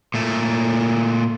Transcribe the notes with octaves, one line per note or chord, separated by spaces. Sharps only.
A#2 A3